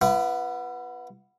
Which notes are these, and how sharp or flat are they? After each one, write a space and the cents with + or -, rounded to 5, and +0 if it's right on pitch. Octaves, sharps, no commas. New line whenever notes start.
B3 -5 E4 +45